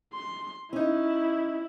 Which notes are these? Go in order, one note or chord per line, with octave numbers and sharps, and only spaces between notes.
C6
C#4 D#4 E4